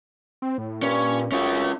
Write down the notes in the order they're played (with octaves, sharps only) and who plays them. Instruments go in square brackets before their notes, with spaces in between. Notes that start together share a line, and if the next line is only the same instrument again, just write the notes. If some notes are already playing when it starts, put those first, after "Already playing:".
[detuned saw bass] C4
A2
[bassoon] G2 [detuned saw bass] A#2 [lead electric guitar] C#4
[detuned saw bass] F1 [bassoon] F#2 [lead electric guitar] C#4 F4